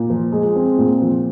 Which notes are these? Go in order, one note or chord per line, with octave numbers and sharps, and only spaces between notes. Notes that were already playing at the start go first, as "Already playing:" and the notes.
Already playing: A#2
F3
G#3
C4
A#2
F3